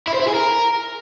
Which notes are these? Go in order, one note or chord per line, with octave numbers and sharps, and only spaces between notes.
E4
C5
E4
G#4
A#4